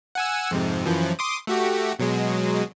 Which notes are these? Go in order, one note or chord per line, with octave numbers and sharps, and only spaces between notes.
F#5 G#5 E6
F2 G#2 C3
F#2 E3 F3
C6 D6 D#6
A3 F#4 G4
B2 F#3 G#3